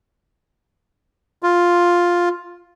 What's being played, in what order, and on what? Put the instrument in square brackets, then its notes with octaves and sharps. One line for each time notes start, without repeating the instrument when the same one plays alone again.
[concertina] F4